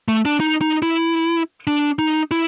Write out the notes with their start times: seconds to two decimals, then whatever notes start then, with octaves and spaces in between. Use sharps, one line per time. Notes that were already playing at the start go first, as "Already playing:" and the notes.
0.08 A3
0.25 D4
0.40 D#4
0.61 D#4
0.82 E4
1.67 D4
1.99 D#4
2.31 E4